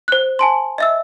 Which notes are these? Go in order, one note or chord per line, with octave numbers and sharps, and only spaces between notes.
C5 F#6
G#5 A5 C6
D#5 E5 E6